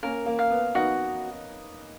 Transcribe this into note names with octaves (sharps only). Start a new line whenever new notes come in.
A#3 C#4 A#4
A#3
F5
B3
B3 D#4 F#4